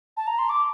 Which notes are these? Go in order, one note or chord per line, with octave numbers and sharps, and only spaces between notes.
A5
A#5
C6
D6